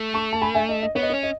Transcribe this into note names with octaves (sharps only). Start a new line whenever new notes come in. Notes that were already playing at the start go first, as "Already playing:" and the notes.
Already playing: A3
A5 C#6
A5
G#5 B5
E5 G#5
D#5
D#5
B3 C#5
D#5
C#5
C#4
D#5